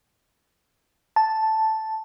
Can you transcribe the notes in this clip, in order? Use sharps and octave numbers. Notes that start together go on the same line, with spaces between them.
A5